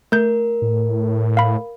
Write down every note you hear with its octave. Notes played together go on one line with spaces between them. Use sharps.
A3 A#4 G6
A2
F5 B5